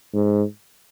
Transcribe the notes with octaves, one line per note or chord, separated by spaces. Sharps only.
G#2